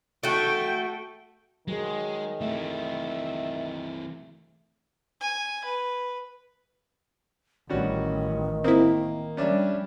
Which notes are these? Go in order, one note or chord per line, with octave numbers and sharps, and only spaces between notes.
A3 F#4 G5
D#3 F#3 G#3 G#4
E3 A3 C4 E5
G#5
B4
A1 D#3 G3 C#4 F#4
A#3 C4 E4 D#6
G3 C#4 D4 E5